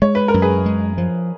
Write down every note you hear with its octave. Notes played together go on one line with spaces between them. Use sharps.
G#3 C#5
B4
A#4
F#2
G#4 B4
G#3
F3